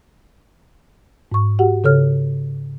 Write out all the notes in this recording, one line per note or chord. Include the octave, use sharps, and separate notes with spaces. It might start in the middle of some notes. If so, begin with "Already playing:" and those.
G#2 C#6
F#4 G4 F#5
C#3 A4 C#5 F6